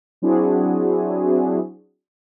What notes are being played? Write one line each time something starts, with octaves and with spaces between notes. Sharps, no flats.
F#3 C4 D4 E4 F#4 G#4